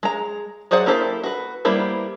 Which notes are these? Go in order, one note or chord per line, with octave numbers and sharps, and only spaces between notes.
G#3 A#5
F#3 G#4 C5 D5 F#5
A#3 E4 G4 A4 C5
F#4 B4
G3 A#3 B3 E4 C5